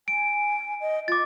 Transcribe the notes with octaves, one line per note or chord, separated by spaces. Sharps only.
G#5 D7
D#5
F4 D6 A6